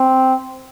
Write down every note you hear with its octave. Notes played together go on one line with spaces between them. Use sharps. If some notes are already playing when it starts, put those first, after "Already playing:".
Already playing: C4